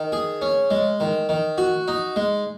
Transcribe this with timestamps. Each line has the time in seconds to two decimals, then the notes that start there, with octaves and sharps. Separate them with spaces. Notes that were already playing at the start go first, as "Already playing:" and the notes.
Already playing: D#3
0.12 G#4
0.42 C#4
0.71 G#3
1.00 D#3
1.29 D#3
1.58 F#4
1.88 D#4
2.16 G#3